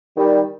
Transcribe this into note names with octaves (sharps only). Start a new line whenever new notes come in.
D#3 G3